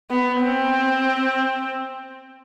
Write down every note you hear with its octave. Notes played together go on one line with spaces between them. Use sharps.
B3
C4